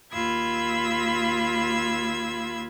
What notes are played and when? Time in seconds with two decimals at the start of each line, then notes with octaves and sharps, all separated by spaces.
0.12 D#2 F4 B5 E6 G#6